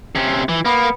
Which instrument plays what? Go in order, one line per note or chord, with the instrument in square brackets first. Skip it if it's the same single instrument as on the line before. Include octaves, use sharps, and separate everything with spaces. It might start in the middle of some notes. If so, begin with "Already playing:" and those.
[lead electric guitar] C3 C#4
E3
[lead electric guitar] A#3 [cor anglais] B3